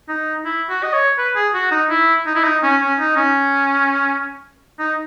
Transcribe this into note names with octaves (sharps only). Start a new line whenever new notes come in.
D#4
E4
F#4
D#5
C#5
B4
G#4
F#4
D#4
E4
D#4
E4
D#4
C#4
C#4
D#4
C#4
D#4